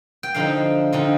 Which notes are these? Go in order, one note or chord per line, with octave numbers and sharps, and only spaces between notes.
G5
D3 F3 C4 D#4 F5
D3 F3 C4 D#4